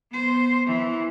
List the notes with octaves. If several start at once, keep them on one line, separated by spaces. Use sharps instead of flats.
B3 C5
E3